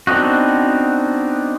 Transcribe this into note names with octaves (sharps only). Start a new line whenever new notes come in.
B3 C4 D4 D#4 F#4